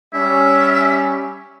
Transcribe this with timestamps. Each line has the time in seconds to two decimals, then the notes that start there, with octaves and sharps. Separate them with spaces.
0.14 G3 C#4 E5